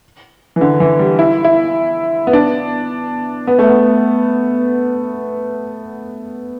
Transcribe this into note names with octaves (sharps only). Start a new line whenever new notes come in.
E3
D3
E3
G3
E4
E4
B3
D4
B3
A3
B3